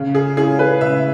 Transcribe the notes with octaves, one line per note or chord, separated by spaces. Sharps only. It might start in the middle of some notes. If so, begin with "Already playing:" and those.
Already playing: C#3
G#4
G#3 C#4 E4 G#4
B4
C#3 E5